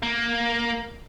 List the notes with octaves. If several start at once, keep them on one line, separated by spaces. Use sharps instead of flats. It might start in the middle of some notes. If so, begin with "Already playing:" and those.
A#3